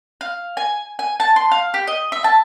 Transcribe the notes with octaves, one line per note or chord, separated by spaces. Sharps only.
F5
G#5
G#5
A5
C6
F5
G4
D#5
E5
A5